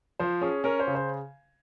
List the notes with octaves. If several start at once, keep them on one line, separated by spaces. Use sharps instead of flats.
F3 C5
C#4 G#4
C#4 A#4
C5
C#3
C5